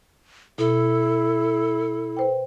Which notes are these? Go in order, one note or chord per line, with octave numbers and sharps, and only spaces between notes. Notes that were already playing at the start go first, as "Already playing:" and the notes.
B2 E4 A4
B4 C5 G5